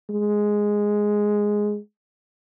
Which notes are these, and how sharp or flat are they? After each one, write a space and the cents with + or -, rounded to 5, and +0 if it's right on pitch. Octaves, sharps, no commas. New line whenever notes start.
G#3 +0